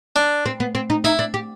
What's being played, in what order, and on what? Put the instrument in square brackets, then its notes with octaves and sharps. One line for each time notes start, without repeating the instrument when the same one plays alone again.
[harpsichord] D4
[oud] C4
B3
C4
D#4
[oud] D#4 [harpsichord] E4
[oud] D4
G4